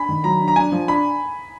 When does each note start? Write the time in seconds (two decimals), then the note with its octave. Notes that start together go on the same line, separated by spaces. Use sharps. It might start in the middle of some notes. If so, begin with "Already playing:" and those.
Already playing: D4 G#5 B5
0.09 D#3
0.24 F#3 A#5
0.40 D4
0.48 A#5
0.56 D4 G#5
0.72 F3
0.88 D4 B5